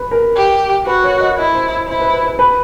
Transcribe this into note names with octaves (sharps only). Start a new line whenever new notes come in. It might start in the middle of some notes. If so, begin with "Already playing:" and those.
Already playing: B4
A#4
G4
F#4 B4
C#5
D#5
E4 D#5
C5
E4 C5
B4
B4
B4
B4